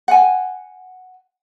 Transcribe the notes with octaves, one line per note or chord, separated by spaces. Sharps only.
F#5 G#5